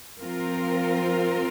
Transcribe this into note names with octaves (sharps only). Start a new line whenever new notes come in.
F3 C4 F4 A#4